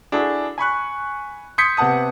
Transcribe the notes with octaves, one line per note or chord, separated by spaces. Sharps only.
D4 E4 F#4 G#4 A4
G#5 B5 C#6 F#6
C6 D#6 G6 G#6 B6 C#7
C3 B3 F#5 A5 D#6